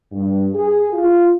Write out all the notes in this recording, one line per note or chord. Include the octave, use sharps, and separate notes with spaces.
G2
G#4
F4